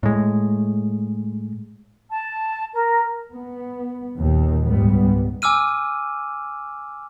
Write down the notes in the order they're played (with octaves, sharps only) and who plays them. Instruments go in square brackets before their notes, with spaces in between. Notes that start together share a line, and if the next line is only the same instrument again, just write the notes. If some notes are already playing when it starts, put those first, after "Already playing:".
[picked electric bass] A2 G#3
[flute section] A5
A#4
[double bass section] B3
D#2 A#2 D#3
C#2 G#2 G3 B3
[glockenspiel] G#5 D6 E6 F6 D#7